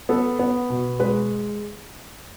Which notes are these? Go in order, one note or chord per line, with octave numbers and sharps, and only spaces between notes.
B3 A4
B3
B2
G#3 B4